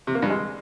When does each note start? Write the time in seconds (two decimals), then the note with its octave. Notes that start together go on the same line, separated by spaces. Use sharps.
0.07 C3
0.15 A#3
0.22 G2
0.30 G#3